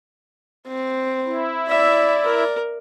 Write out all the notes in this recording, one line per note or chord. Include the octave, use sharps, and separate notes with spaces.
C4
E4
D5 E5
A#4